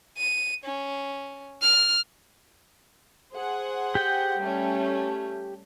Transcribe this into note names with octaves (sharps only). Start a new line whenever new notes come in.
D#7
C#4
F6
G#4 C5 F#5
G4 G5
G3 A3 C#4